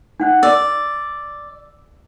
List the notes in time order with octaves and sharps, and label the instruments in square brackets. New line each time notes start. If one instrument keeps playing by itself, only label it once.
[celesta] D#4 F#5 F#6
[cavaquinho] D5 [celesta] E6